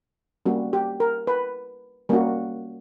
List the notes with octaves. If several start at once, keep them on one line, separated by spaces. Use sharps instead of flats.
G3 A#3 C#4 F#4
G4
A#4
B4
G3 A#3 C#4 F#4